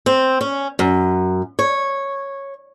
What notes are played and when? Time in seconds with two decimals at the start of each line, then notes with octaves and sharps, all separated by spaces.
0.06 C4
0.41 C#4
0.79 F#2
1.59 C#5